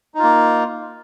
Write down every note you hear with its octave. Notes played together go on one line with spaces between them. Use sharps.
A#3 D#4 F4